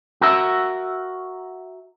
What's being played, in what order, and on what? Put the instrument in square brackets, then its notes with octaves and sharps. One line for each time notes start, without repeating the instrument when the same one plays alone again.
[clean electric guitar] F#4 A#4 E5